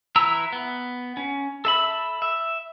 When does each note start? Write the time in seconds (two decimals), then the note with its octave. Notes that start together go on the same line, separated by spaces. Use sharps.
0.16 E3 E4 A#5 E6
0.53 B3
1.17 C#4
1.65 A4 E5 B5
2.22 E5